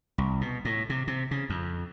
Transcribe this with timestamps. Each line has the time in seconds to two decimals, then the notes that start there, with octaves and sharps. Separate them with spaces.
0.18 C2
0.41 B2
0.65 A2
0.90 C3
1.07 C3
1.31 C#3
1.50 F2